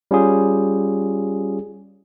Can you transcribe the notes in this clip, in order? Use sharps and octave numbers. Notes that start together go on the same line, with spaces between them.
G3 C#4 F4 G#4